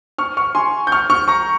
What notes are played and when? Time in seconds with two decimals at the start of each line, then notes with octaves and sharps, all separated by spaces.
0.18 C#6 F6
0.37 C#6 F6
0.55 G#5 C6
0.87 G6
0.92 C#6 F6
1.10 C#6 F6
1.28 A#5 C#6